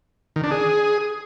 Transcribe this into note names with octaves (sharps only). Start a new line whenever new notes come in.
D#3
D4
G#4